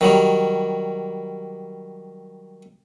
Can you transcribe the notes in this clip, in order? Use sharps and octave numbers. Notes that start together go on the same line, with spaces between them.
D#3 F#3 G3